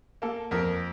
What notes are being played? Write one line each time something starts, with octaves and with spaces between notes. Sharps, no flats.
A#3 A4
F2 A#4